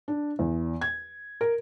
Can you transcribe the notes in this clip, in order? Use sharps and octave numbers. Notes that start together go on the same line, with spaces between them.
D4
E2
G#6
A#4